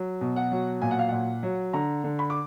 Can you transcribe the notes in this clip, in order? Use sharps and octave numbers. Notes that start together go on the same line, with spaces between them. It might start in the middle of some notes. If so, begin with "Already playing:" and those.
Already playing: F#3
B2
F#5
F#3
A#2 G#5
F#5
F5
A#2 F#5
F#3
D3 A#5
D3
B5
D6